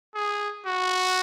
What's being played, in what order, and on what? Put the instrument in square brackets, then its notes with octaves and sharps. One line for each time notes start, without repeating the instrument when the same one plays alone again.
[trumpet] G#4
F#4